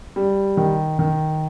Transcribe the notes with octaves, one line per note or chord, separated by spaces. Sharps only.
G3
D#3
D#3